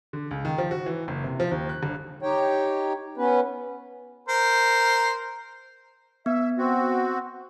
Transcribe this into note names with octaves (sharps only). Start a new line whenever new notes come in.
D3
C#2
D#3
F3
F#4
E3
F#1
C3
F3
D#2
F#6
G1
D#4 G4 C#5 G5
B3 C#4 B4
A#4 C5
B3 E5
C4 F#4